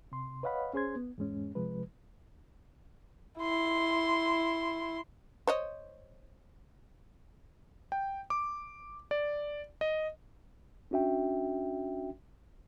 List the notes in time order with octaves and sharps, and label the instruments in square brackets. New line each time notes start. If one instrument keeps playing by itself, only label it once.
[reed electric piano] C3 C6
B4 C#5 D#5 F5 F#5 B5
C#4 G#4 C5 C6 G#6
B3
E2 G#2 G#3 C#4
C3 F3 G#3 B4
[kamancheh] E4 C6
[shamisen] C5 C#5 D#5
[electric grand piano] G5
D6
D5
D#5
[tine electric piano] C#4 D4 F#4 E5 G5